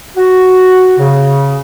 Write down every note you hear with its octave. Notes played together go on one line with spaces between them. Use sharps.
F#4
C#3